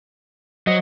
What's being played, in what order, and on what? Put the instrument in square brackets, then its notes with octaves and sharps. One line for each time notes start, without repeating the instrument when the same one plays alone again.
[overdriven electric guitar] F#3 [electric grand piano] C5 D#5